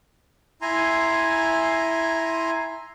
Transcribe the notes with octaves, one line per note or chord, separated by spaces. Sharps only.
E4 G#5 A#5 C6